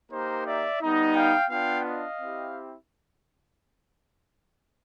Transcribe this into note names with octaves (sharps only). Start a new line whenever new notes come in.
A#3 D#4 G4 A#4 C5
D5 E5
G3 B3 D#4
F5 G5
B3 D4 F4 F5 G5
D#5 F5
C4 E4 G4